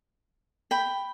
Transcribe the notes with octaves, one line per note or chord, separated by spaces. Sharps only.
G5 B5